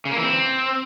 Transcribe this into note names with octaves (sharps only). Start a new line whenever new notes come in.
C#3
A#3
E3
C4